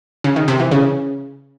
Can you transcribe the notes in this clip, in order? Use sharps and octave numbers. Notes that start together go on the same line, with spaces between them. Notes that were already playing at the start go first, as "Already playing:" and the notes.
C#3
D#3
C3
E3
C#3